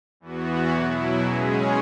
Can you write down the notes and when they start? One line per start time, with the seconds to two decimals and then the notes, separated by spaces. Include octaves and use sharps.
0.20 E2 E3 B3 F#4
0.71 B2 F#3 E4
1.23 C#3 G#3 C#4 G#4